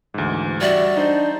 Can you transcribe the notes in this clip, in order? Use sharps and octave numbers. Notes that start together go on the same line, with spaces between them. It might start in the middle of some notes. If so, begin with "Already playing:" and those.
D2 G#2 E3
G3 F#4 D5 E5
D4 D#4 C5